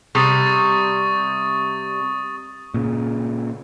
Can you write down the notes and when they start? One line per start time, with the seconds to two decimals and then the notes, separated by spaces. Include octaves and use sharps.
0.15 C3 G3 C#6 D#6 A6
2.74 A#2 C#3